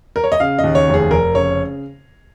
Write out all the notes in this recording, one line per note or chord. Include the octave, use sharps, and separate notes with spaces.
A#4
C#5
D#5
C#3 F5
D#5
D#2
C#5
F1
G#4
F1 A#4
C#3 C#5